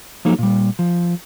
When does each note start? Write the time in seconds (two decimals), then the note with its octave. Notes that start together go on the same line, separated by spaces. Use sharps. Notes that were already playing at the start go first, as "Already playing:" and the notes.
0.25 F3 F#3 A#3 D#4 A4
0.39 A#2 G3
0.79 F3